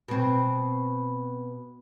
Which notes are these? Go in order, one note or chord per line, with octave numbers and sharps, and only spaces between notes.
B2 C4